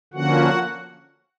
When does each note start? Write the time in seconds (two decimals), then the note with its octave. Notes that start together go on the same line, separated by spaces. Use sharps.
0.13 D3 F3 A#3 C#4 F#4 F#5